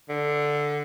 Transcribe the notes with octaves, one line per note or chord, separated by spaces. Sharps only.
D3